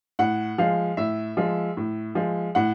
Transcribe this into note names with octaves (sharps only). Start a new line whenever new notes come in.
A2 F#5
F3 G#3 F5
A2 E5
F3 G#3
A2
F3 G#3
A2 F#5